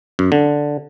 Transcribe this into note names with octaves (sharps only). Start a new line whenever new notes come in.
F#2
D3